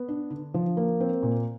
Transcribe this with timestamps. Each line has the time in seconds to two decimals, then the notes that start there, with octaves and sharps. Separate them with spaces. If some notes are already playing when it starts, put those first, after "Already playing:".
Already playing: B3
0.08 D4
0.30 D3
0.54 F3
0.77 A#3
1.00 C4
1.23 A#2